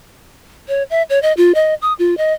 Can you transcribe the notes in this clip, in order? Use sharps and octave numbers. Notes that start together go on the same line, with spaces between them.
C#5
E5
C#5
D#5
F4
D#5
D#6
F4
D#5